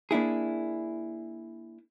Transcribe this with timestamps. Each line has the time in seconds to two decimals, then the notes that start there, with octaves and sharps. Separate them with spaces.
0.11 A#3 D4 E4 G#4